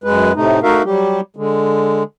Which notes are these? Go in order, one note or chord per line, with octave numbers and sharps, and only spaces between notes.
F#2 G#3 B4
A2 C3 A3 D#4
A3 D#4 F#4 A#4 E5 F5
F#3 G3 G4
D3 G#3